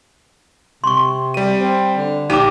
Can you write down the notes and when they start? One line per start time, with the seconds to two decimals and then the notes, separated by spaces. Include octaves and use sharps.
0.84 C3 C6 C#6
1.34 G3 D#7
1.60 C4
1.96 D3
2.30 A#1 D#4 G4 A5 D6 D#7